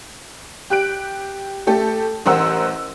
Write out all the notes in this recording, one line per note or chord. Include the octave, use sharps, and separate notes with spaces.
G4 F#6 D7
A3 G4 A4
A1 A#4 C5 F#5 E6